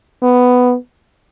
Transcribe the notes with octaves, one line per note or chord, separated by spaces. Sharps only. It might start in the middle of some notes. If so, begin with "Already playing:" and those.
B3